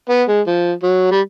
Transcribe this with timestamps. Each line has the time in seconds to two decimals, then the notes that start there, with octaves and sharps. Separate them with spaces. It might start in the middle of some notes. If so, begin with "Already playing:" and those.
0.09 B3
0.28 G#3
0.47 F3
0.83 F#3
1.11 G3